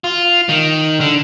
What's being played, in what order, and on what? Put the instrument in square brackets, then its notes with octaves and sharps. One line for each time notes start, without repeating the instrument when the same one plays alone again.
[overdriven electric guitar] F4
D#3
D3